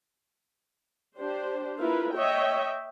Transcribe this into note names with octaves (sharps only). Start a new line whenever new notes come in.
D4 G4 C5
A#3 E4 F4 A#4 B4
C#5 D#5 E5 G5